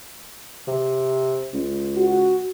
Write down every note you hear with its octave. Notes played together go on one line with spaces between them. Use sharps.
C3
C#2
F#4